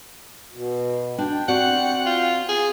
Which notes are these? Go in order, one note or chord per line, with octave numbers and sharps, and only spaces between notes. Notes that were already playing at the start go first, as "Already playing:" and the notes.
B2
D4 G5
C4 F#4 D5 F#5
F4
G#4